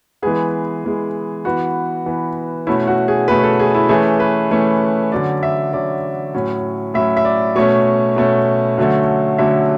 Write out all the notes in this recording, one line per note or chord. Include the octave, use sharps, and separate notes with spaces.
E3 G#3 B3 G#4
E3 G#3 B3
E3 B3 F#4
E3 B3
B2 A3 C#4 E4
F#4
G#4
B2 A3 C#4 B4
A4
G#4
E4
E3 A3 C#4 G#4
B4
E3 A3 C#4
D3 F#3 C#4 D5
E5
D3 F#3 C#4 D5
A2 F#3 C#4
A2 F#3 C#4 E5
E5
D5
B2 A3 C#4 C#5
B2 A3 C#4
D3 F#3 A3 C#4
D3 F#3 A3 C#4 E5